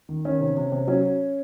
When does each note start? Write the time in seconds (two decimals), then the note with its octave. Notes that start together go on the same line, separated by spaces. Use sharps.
0.09 D#3
0.25 D#3 C#4
0.40 C3
0.57 C3
0.72 C3
0.87 F#3 C#4